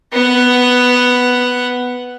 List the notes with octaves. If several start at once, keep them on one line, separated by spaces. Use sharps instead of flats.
B3 F#5